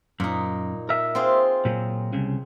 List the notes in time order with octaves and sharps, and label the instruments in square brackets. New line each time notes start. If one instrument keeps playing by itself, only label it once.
[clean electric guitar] F#2 [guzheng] A#2 D#4
[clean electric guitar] A#4 E5
[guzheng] C4 F4 G#4
[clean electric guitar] A#2 F#3
C2 C#3